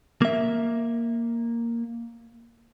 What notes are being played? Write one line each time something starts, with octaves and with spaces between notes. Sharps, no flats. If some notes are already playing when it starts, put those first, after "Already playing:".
A#3 E5